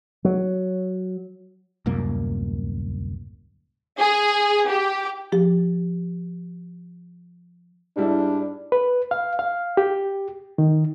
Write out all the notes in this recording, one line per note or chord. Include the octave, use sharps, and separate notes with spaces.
F#3
D1 C2 F#2 A#3
G#4
G4
F3 G4
G#2 G3 D4 E4
B4
F5
F5
G4
D#3